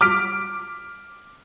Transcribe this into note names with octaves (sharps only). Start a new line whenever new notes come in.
D6 F6 B6 D7